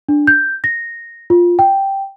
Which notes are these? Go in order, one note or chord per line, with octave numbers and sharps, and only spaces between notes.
D4
G6
A#6
F4
G5